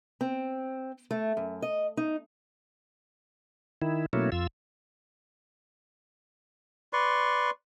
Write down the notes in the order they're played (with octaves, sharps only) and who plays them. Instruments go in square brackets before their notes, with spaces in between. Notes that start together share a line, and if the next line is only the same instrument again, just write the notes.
[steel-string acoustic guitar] C4
A3
F#2
D#5
D#4
[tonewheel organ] D#3 E4
B2 F#3 A3 A#3 C#4 E4
F2 F4 E6
[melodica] B4 D5 C6 C#6